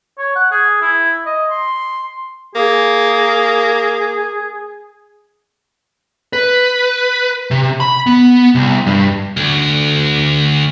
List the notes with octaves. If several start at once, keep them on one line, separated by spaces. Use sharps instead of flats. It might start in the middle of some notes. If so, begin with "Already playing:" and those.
C#5
F#5
G#4
E4
D#5
C6
A#3 G#4
B4
C3
B5
B3
C2
G2
D2